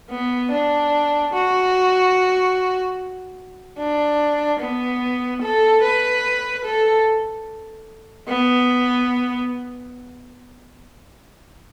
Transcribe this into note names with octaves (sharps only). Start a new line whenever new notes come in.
B3
D4
F#4
D4
B3
A4
B4
A4
B3